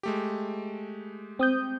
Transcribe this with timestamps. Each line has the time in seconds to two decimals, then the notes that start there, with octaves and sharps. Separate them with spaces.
0.03 G#3 A3 G4
1.39 C4 D#6 G6